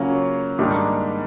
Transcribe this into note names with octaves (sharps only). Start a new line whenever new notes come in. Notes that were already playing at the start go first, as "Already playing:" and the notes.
Already playing: C#3 F#3 A#3 C#4 F4
G#2 D#3 G3 A#3 D4